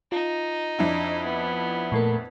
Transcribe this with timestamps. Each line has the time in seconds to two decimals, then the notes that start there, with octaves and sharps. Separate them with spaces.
0.12 D#4 F4
0.79 F2 D4 E4
1.24 B3
1.92 A#2 A3 A#4